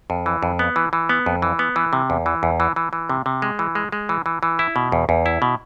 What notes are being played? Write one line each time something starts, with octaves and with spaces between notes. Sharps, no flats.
F2
E3
F2
B3
E3
E3
B3
F2
E3
B3
E3
C3
E2
E3
E2
E3
E3
E3
C3
C3
G#3
E3
G#3
G#3
E3
E3
E3
E4
B2
E2
E2
E4
B2